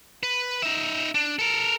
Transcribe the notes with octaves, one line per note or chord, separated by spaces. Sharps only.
B4
D#4 E5
D4
A4 A#4